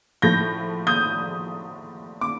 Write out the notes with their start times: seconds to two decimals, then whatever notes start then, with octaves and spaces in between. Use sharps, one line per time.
0.22 A2 F3 A3 G6 A#6
0.87 D#6 G6
2.21 D6